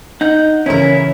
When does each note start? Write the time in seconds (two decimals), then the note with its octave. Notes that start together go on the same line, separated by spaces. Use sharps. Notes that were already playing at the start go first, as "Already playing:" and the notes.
0.21 D#4 F#5 G6
0.66 C#3 E3 C#4 E4 A#4